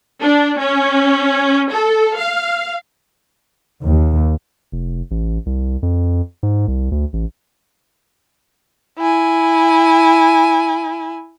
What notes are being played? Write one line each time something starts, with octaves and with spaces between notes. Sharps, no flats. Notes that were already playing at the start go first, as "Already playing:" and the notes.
D4
C#4
A4
F5
D#2
F1
A1
C2
F2
G#2
C2
D2
A1
E4 G#5